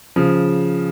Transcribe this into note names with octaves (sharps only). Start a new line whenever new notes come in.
C#3 F3